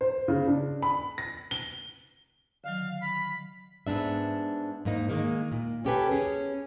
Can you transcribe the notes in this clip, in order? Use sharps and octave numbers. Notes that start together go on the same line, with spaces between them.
C5
C#3
D4
B5
A#6
G7
D3 D#3 F#3 F5
B5
G#2 B3 D4 E5
G#2 A#3 D#4
D#3 G#3 A#3 D#4
A#2
C#4 F4 G4 A4 B4 G#5
C#4 G#4